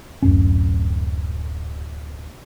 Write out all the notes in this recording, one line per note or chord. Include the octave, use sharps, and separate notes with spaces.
D1 F#2 C#4